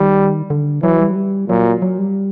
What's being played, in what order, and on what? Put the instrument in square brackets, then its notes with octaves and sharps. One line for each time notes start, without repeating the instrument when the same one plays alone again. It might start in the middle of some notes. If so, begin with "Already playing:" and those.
Already playing: [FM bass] D#3 [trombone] G3
[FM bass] D3
[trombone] E3 [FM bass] F#3
[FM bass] G3
F#3
G3
[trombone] A#2 [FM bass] F#3
[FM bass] F#3
G3